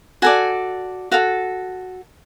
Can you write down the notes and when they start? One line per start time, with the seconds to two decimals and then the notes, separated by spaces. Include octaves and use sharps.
0.22 F#4 A4 D5 G#5
1.11 F#4 A4 F5